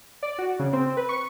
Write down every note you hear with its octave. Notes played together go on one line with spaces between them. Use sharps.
D5
F#4
C#3
C4
B4
C#6